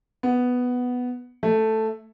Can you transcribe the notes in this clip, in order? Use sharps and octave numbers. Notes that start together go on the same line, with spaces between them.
B3
A3